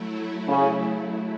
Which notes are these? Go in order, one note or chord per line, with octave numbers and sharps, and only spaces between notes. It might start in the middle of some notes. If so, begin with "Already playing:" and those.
Already playing: F#3 A3 E4
C#3